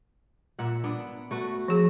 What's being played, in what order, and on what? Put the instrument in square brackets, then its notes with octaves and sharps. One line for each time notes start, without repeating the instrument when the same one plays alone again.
[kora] A#2 E5 F#5
B3 D4
A3 F#4 B4
[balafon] F3 G#4